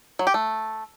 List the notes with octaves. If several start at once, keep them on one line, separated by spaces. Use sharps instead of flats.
F#3
G4
A3